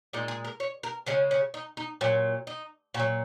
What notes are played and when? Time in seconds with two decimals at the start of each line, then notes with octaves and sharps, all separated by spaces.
0.13 A#2 G#3 D#4
0.28 G#4
0.44 A#4
0.60 C#5
0.83 A#4
1.06 C#3 G#3 C#4
1.31 C#4
1.54 D#4
1.77 D#4
2.01 A#2 F#3 C#4
2.47 D#4
2.94 A#2 F#4
2.99 F#3